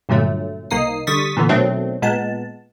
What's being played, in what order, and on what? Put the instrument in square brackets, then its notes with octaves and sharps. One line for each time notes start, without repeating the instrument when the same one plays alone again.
[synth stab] G2 A#2 D3 F#3 A3
C2 A#3 D#4 D#6 C7
D3 G3 C#6 D#6 A6 B6
A#2 D3 E3 B3
B2 D#3 F#3 A3 C4 D4
A#2 G#3 B3 A5